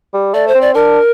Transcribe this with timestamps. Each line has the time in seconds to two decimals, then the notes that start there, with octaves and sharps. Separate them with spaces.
0.13 G3
0.34 A3 D5
0.48 C5
0.55 C4
0.61 D5
0.75 D4 A#4